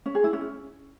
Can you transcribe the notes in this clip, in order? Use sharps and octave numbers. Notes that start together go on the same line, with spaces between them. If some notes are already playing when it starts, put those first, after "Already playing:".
C#4
G#4
E4
C#4